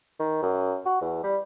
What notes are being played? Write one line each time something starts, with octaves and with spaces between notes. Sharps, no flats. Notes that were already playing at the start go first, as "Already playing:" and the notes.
D#3
F#2
F#4
E2
G3